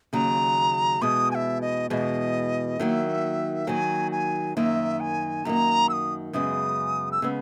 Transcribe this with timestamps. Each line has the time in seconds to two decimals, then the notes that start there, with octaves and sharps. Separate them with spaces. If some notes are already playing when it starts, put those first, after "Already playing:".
0.13 D#2 C#3 F#3 A#5
1.01 E2 B2 G#3 D#6
1.31 G#5
1.35 E5
1.61 D#5
1.90 E2 B2 G#3 D#5
2.80 D#3 F#3 A#3 E5
3.67 D#3 F#3 A#3 G#5
4.12 G#5
4.56 F#2 D#3 A#3 E5
5.00 G#5
5.45 F#2 D#3 A#3 A#5
5.89 E6
5.93 D#6
6.33 F#2 C#3 G#3 B3 D#6
7.12 E6
7.22 C#3 G#3 B3 E6